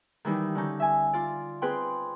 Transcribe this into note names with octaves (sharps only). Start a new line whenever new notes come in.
D#3 E3 G3 D#4
D3 C#4 D#4 G6
E5 G#5
F4 D5
C4 G#4 B4 G5 C6